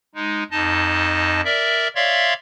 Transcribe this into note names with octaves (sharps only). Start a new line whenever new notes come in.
G#3 D#4
F2 D#4 D#5 A5
A#4 D5 E5
C#5 D5 E5 F5 C6